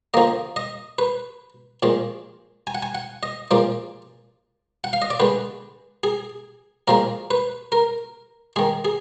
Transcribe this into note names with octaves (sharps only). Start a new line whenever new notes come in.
D3 F3 A#3 D#5
D#5
B4
A#2 F3 G#3
G#5
F#5
G#5
F#5
D#5
A#2 F3 G#3 D5
F#5
F5
D#5
D5
D3 G#3 B4
G#4
A#2 F3 G#3 A#4
B4
A#4
D#3 G#3 G#4
G#4